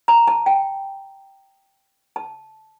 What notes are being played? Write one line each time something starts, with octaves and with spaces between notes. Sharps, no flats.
A#5
A5
G5
A5